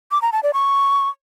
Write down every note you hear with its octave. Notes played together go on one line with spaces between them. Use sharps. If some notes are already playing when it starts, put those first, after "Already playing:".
D6
A#5
A5
D5
C#6